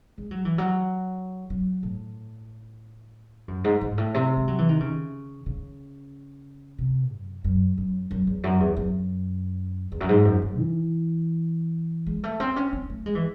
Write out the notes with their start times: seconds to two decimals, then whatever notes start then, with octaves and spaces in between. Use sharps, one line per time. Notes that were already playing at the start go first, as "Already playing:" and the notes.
0.18 G#3
0.31 F#3
0.45 E3
0.58 F#3
1.50 F#3
1.83 A2
3.48 F#2
3.64 G#2
3.81 G#2
3.98 A2
4.14 C3
4.37 G#3
4.48 F#3
4.58 E3
4.69 D#3
4.80 C#3
5.46 C#3
6.78 C3
7.11 F#2
7.44 F#2
7.78 F#2
8.11 F#2
8.27 E2
8.44 F#2
8.60 E2
8.77 F#2
9.92 E2
10.00 F#2
10.09 G#2
10.25 F#2
10.42 F#2
10.58 E3
12.06 G#3
12.24 A3
12.40 C4
12.56 C#4
12.73 C4
12.90 A3
13.06 G#3
13.15 E3